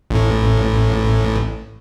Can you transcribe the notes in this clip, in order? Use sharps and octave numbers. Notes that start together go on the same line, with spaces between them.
A1 A2